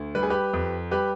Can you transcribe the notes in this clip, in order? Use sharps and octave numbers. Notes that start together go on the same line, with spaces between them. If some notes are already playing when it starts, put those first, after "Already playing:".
Already playing: D2
G3 B4
G#4
G4 B4
F2
G3 G4 B4